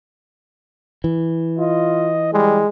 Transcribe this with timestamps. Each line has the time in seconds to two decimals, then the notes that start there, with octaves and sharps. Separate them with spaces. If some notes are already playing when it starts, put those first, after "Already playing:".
1.04 E3
1.59 F4 D#5
2.33 G3 G#3